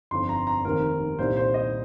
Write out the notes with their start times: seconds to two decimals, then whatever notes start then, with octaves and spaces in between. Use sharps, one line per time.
0.11 G1 F2 F3 C4 D#4 C6
0.29 A#5
0.47 A#5
0.65 F1 D#2 D#3 C4 A#4
1.19 C2 A#2 G3 D#4 C5
1.37 C5
1.54 D#5